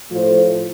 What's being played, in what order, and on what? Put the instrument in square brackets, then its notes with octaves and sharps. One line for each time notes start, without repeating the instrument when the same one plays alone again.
[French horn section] A2 F3 A3 F4 C5